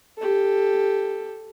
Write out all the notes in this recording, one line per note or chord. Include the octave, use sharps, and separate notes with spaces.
G4 A4